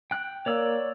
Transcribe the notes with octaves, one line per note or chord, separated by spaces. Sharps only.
G5 F#6
A#3 C#5 D5 E6